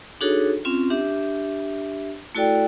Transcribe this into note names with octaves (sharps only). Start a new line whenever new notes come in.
D4 D#4 F#4 G#4 A4 C#5
C4 C#4 F4
D4 G4 E5
A3 E4 F#4 A4 D5 G5